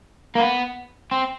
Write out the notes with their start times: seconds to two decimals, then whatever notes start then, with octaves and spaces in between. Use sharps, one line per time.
0.35 A#3
0.40 B3
1.12 C4